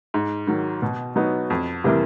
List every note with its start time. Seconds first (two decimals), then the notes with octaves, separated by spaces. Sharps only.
0.14 G#2
0.47 D#3 F#3
0.82 B2
1.16 F#3 B3 D#4
1.50 F2
1.84 C3 E3 G3 A#3